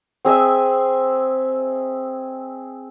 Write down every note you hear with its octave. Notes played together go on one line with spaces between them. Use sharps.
C4 G#4 D#5 E5